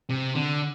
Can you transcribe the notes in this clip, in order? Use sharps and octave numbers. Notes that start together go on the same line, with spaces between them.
C3
D3